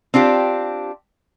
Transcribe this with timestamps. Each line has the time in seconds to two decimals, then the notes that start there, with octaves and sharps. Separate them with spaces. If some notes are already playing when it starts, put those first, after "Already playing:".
0.14 C4 D4 F4 G4